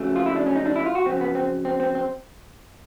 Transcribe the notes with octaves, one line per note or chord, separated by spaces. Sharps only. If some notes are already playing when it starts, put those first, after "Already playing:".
Already playing: F2 C#3 F#3 A3
F4
E4
D4
C#4
D#4
D4
E4
F4
F#4
F2 C#3 F#3 C4
B3
C4
C4
C4
C4